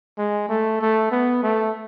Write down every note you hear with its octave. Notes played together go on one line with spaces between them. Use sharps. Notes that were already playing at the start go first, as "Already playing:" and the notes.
G#3
A3
A3
B3
A3